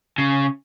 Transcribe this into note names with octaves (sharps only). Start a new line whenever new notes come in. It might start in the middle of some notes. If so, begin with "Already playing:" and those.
C#3